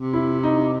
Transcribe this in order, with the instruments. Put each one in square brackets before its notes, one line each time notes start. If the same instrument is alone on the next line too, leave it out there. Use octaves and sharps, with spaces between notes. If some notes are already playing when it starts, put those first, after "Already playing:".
Already playing: [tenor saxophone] C3
[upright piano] E4
D#4